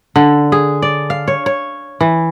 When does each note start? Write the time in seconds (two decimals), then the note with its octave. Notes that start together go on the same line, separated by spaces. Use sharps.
0.16 D3
0.52 G#4
0.82 D5
1.10 F5
1.28 C#5
1.46 C#5
2.01 E3